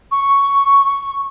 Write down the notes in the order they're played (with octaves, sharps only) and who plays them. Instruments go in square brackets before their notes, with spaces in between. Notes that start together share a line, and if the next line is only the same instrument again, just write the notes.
[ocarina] C#6